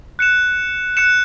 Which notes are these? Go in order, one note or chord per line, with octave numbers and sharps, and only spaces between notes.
F#6 C#7 E7
F#6 C#7 E7